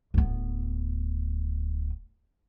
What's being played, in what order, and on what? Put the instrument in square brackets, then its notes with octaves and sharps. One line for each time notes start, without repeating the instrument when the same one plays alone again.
[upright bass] D1 B3